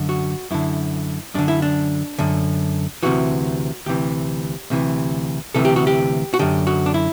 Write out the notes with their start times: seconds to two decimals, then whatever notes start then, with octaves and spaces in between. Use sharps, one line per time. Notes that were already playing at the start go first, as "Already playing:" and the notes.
Already playing: F#2 D3
0.09 F#4
0.51 F#2 D3 E4
1.34 F#2 D3 D4
1.48 E4
1.62 D4
2.19 F#2 D3
3.03 D2 C3 E3 F#4
3.86 D2 C3 E3 G4
4.70 D2 C3 E3
5.55 D2 C3 E3 A4
5.65 G4
5.76 F#4
5.87 G4
6.34 F#4
6.39 F#2 D3 G4
6.67 F#4
6.86 D4
6.94 E4